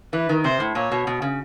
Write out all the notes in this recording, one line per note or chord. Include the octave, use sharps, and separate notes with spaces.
E3 B4
D#3
C3 C5
A2
A#2 C#5
B2
B2
C#3